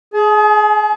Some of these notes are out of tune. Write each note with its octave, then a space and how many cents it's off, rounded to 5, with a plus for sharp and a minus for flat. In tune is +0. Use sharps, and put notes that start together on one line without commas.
G#4 +15 G#5 +45